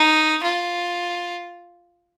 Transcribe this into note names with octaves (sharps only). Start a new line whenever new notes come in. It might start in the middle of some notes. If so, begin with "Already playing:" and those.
Already playing: D#4
F4